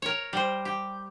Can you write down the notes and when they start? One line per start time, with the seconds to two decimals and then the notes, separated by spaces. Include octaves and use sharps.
0.02 A#4 C#5
0.33 G3 C5
0.65 G4